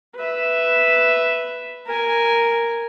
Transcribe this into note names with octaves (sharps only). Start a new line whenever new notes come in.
B4 E5
A#4 G#5